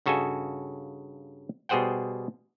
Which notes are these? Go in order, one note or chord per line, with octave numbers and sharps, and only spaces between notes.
G2 C#3 F#4 A4 D#5 G#5
B2 G3 G#4 C5 F#5 G5